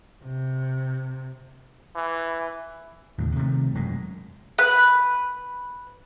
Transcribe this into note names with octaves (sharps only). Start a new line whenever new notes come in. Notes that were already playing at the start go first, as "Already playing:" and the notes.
C3
E3
D#2 A2 C#3
C3 D#3 G#3 A3
E1 F#2 G#3
B4 F#6